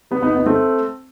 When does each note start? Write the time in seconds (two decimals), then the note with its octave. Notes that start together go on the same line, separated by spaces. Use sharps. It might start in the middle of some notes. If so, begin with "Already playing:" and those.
0.11 G3 B3
0.22 B3 D#4
0.35 B3 D#4
0.46 A3 C4